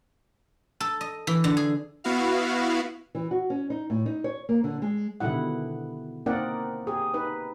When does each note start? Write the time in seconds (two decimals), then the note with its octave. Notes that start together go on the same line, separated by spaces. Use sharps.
0.81 A4
1.01 D#5
1.27 E3
1.44 D3
1.57 G#4
2.04 B3 E4 F#4 F5
3.15 E3
3.31 F#4
3.50 C#4
3.70 D#4
3.90 A2
4.06 D#4
4.24 C#5
4.49 A#3
4.64 D3
4.82 G#3
5.20 B2 D3 D#3 G3 E4 F#5
6.26 A#3 C4 D#4 A#4 D5 F#5
6.87 G4 G#4
7.14 D#4 B4